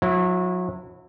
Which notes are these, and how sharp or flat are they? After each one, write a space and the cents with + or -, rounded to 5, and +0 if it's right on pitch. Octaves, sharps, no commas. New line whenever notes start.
F#3 -35 E4 +0